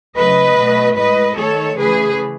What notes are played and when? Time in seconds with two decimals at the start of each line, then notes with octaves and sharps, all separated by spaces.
0.16 C#3 F#3 A3 B4 D#5
0.57 B2 A3
0.97 A2 G#3 B4 D#5
1.37 D#3 A3 A4 C#5
1.78 C#3 E3 A3 G#4 B4